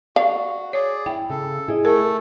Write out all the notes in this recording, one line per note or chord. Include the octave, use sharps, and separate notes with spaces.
F#4 D5 F5
G#4 C#5 D5
E4 G5
C#3 A4
E4 G#4 D#5
A3 A4 A#4